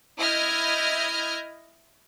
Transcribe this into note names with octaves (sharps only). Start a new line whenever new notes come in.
E4 D#5 F6 G6 G#6